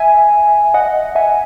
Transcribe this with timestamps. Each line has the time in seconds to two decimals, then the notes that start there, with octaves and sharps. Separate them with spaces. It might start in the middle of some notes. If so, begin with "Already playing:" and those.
Already playing: E5 G#5
0.74 D#5 F#5
1.15 E5 G#5